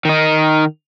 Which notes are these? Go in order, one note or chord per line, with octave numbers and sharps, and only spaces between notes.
D#3 D#4